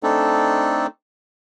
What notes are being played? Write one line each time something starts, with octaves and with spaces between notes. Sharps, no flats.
A3 C4 D4 D#4 A4